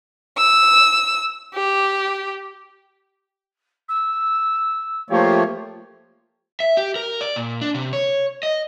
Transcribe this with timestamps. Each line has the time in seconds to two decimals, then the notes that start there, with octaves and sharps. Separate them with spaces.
0.38 E6
1.54 G4
3.88 E6
5.10 F3 A3 A#3 F4 G4 C#5
6.60 E5
6.77 G4
6.96 A#4
7.21 D5
7.36 A#2
7.61 D4
7.75 C3
7.93 C#5
8.43 D#5